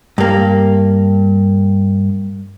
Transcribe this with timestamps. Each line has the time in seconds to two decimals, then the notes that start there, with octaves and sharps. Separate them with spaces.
0.18 G2 A#3